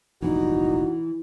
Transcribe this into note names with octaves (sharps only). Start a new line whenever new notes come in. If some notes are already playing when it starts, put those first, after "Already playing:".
F1 A#1 G2 E3 D#4 F#4